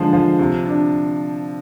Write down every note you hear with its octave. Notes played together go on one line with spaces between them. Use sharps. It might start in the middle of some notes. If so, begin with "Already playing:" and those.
Already playing: D3 F3 G#3 C5
F3
C3
D4